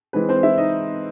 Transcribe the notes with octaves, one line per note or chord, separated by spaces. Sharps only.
E3 G#3 C4 B4
C4 C5
E4 E5
D#4 D#5